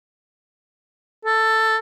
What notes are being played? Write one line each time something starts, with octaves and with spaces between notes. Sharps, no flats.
A4